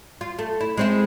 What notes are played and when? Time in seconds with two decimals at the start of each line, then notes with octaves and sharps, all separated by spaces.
0.21 F4
0.39 A3
0.61 E4
0.77 G#3 C4 E4